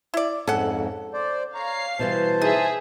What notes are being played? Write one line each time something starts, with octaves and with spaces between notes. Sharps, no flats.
E4 D5
F2 G#2 C#4 A4 F#5
C5 D5
C#5 F5 A#5 C7
B2 E3 G3 C5 A5
D#4 G#4 E5